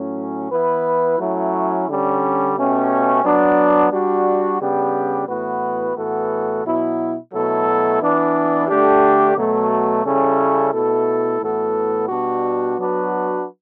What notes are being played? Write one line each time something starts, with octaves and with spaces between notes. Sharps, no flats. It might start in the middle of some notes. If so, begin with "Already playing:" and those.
Already playing: A2 F#3 C#4
E3 B3 E4 B4
F#3 A3 C#4 E4
D3 G3 C#4
B2 A3 C#4 G4
F#3 B3 D4
G3 D4 F#4
C#3 G3 B3 D4 G4
A2 E3 B3 F#4 B4
A2 E3 B3 F#4 A4
B2 F#3 B3 E4
B2 F#3 A3 E4 A4
E3 B3 D4
D3 A3 D4 G4
B2 F#3 A3
C#3 G3 C#4 E4 A4
B2 A3 E4 A4
A2 E3 B3 F#4 A4
B2 G3 D4 F#4
F#3 B3 D4 F#4 B4